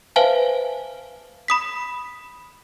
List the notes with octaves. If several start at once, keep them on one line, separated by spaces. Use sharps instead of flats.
B4 C5 E5 F5 G#5 A5
B5 D#6 B6